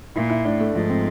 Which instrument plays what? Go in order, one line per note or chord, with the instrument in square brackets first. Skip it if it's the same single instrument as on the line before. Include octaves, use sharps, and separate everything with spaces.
[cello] A#2 [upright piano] E4
[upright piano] E4
[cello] A2 [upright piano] D4
[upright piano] A3
[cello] G#2 [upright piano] F3
[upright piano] C4